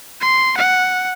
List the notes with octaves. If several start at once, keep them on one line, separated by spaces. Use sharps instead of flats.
C6
F#5